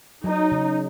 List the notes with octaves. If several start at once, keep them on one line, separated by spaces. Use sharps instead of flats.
F#3 D#4
C#3